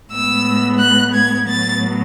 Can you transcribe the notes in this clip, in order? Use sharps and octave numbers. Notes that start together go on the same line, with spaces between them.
A2 G#3 B3 E6
F#6
G#6
A2 F#3 B3 A6